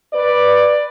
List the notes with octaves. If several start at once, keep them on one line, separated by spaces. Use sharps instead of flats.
B4 D5